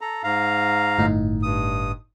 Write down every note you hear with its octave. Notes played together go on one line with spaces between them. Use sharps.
A4 A#5
G#2 F5 A#5
G1 A2 D#4
G2 D#6